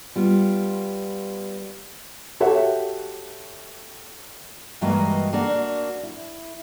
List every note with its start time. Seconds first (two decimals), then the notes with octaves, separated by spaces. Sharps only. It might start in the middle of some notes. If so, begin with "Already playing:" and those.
0.16 G3 B3 F4
2.40 F#4 G4 A4 C#5 E5 F#5
4.81 G2 E3 G#3 A#3 F#4 D#5
5.33 A#3 D4 F#4
6.03 E4